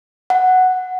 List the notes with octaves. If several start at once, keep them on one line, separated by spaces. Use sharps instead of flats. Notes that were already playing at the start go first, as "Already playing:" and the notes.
F#5